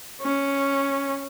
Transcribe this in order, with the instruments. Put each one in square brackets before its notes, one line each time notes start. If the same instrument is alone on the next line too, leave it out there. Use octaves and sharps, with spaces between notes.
[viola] C#4